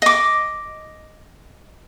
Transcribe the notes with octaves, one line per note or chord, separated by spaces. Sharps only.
D#5 D6